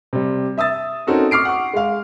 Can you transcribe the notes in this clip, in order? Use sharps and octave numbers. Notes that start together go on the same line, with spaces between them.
C3 G3
E5 D#6 E6 A6
C4 C#4 D#4 F#4 A4 A#4
C#6 D6 F6 C7 D7
F#5 C#6
G#3 F5